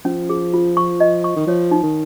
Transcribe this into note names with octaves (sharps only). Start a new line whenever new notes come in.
F3 C#4
G#4
F4
C#6
D#5
C#6
D#3
F3 C#5
D#4
D#3